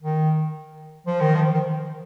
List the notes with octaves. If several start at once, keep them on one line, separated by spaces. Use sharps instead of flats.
D#3
F3
D#3
F3
D#3